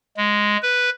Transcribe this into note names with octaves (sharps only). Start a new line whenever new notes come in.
G#3
B4